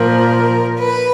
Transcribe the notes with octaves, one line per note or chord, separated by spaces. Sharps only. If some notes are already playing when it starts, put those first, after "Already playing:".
Already playing: A#2 F3 A#4
B4